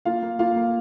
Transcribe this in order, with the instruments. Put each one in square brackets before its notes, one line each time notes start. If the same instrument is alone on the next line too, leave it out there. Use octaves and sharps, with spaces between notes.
[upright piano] A#3 F4 F5
A#3
A#3 F4 F5
A#3